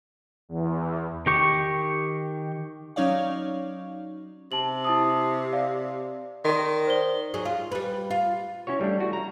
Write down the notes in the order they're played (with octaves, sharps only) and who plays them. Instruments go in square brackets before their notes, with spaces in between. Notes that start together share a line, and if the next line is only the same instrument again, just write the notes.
[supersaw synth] E2
[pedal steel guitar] D#3 G4 C#6
[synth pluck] F#3 C#4 D#4 C#5 D5 F5
[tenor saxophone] C3 [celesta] A5 F#7
[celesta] E4 A5 D#6
D5 F5
[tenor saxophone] D#3 [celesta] D5 C6
[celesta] C5 D5 G7
[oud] F#3 G#4
F4
G3 B4
F4
[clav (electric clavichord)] C#4 E4 F#4 C#5
G3 A3 D4
E4 F#4
A#5